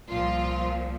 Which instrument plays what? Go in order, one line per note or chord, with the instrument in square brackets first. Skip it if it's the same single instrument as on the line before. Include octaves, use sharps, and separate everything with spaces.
[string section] C2 A#2 F3 F4